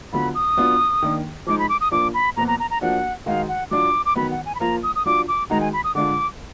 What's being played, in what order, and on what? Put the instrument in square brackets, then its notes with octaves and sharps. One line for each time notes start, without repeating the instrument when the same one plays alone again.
[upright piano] D3 F#3 B3 F4 [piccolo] B5
[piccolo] D#6
[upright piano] F#3 B3 D4 F4
D#3 A#3 D4
[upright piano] F3 G#3 D#4 [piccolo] D6
[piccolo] B5
D6
D#6
[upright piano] A#2 F3 A#3 D4 F4 [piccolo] D6
[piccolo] B5
[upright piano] A#2 F3 B3 [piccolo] A#5
[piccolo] A#5
A#5
A#5
[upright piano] F3 A#3 D4 F#4 [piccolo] F#5
[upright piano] D#3 G#3 D#4 F#4 [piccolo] F5
[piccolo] F#5
[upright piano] F#3 D4 F4 [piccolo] D6
[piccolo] D6
[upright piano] D#3 F#3 B3 [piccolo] B5
[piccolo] F#5
G#5
B5
[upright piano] F3 A#3 F4 [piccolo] A#5
[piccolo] D#6
D#6
[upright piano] F#3 D4 F4 [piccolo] D6
[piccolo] D6
[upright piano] D#3 G#3 D#4 F#4 [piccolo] A#5
[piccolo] G#5
B5
D#6
[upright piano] D3 G#3 D4 F4 [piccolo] D6